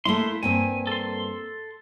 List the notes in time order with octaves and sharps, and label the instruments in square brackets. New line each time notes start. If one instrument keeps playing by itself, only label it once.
[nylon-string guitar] A3 A#3 E4 [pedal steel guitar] C6
[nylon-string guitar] G2 A#3 C4 [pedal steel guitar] G#5
[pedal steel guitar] A4 C6